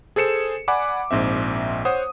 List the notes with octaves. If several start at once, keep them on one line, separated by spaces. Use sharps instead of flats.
G#4 A4 C5 C#7 E7
D5 F#5 G#5 B5 D6
A#1 G#2 C4 E5
C5 C#5 F#5 D#6